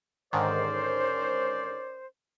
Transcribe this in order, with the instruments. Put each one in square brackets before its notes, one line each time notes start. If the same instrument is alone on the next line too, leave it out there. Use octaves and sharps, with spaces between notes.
[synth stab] G#2 D3 D#3 [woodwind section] C#4 A#4 C5 [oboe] D5